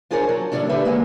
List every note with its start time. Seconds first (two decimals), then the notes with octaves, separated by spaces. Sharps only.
0.11 D4 F4 G#4 A#4 C5 C#5
0.29 F#3
0.52 A#2 D3 E3 G3 C#4 D4
0.69 D3 G4 B4 E5
0.85 F#3 G#3 A#3